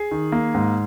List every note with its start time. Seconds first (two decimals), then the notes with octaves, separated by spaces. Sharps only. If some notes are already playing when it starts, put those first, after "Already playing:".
Already playing: G#4
0.11 D#3
0.32 A#3
0.54 G#2